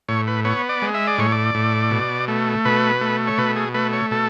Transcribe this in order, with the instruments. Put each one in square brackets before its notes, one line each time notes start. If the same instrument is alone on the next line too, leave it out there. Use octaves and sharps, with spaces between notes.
[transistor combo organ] A2 C#5
B4
B3 C#5
D5
G#3
E5
D5
A2 C#5
D5
A2
B2
A3
B2 B4
A3
C#5
B2 B4
G#4
A3 B4
C#5
B2 A4